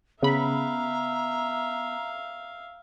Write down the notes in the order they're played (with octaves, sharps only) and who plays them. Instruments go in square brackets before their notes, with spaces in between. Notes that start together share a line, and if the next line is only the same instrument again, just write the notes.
[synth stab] C#3 B5 [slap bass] B3 [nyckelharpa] E5 F5 [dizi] A#5